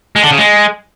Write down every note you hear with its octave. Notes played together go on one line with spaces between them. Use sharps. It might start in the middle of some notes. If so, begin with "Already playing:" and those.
G#3
D3
C#3
G#3